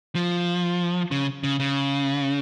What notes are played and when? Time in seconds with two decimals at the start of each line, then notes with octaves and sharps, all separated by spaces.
0.15 F3
1.11 C#3
1.44 C#3
1.60 C#3